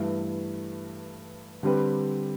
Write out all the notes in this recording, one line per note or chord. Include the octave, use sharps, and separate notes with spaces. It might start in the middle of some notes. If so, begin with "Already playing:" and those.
Already playing: G2 E3 A3
D3 G3 C4 G4 B4